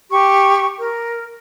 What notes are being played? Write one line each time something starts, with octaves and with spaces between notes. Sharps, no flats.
G4 C#6
A#4